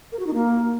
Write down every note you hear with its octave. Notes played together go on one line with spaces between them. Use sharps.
A#4
F#4
D#4
A#3